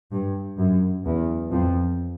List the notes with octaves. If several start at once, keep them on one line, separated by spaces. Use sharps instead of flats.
G2
F#2
E2
F2